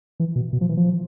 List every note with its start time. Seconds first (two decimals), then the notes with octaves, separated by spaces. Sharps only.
0.20 E3
0.36 B2
0.53 B2
0.61 F3
0.69 E3
0.77 F3